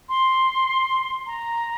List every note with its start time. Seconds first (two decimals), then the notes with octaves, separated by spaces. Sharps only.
0.09 C6
1.26 A#5